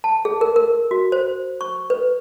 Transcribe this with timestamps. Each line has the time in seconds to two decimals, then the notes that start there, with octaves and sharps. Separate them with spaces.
0.04 A5
0.25 G#4
0.41 A#4
0.56 A#4
0.91 F#4
1.12 C5
1.61 C#6
1.90 B4